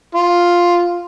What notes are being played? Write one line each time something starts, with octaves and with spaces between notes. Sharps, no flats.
F4